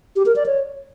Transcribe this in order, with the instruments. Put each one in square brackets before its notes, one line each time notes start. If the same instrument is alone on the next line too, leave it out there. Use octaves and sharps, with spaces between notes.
[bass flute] G4
A#4
D5
C#5